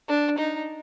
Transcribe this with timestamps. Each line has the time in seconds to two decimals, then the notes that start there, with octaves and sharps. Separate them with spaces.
0.09 D4
0.38 D#4